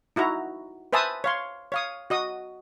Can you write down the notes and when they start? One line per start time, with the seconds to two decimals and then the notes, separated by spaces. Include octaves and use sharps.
0.16 D#4 E4 F#4 A#5
0.93 B4 C5 E5 G#5 A5 D#6
1.24 C#5 F5 C6
1.72 C#5 F5 D#6
2.10 F#4 D#5 D#6